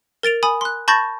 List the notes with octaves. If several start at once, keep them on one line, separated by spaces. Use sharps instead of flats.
A#4 A6 D7 F7
G#5 B5 D#6
C6 F#6
A5 B5 C#6 G6 A6 A#6